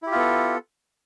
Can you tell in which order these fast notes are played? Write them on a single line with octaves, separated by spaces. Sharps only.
E4 G4 F4 B3 A4